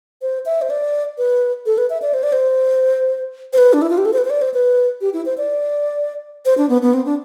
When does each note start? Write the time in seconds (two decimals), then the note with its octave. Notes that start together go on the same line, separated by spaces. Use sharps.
0.22 C5
0.46 E5
0.62 C5
0.70 D5
1.18 B4
1.66 A4
1.78 B4
1.90 E5
2.02 D5
2.14 C5
2.23 D5
2.33 C5
3.53 C5
3.58 B4
3.73 D4
3.82 E4
3.90 F4
3.98 G4
4.05 A4
4.13 C5
4.18 B4
4.25 C5
4.30 D5
4.42 C5
4.54 B4
5.01 G4
5.13 E4
5.26 C5
5.38 D5
6.45 C5
6.58 D4
6.69 B3
6.82 B3
6.93 C4
7.06 D4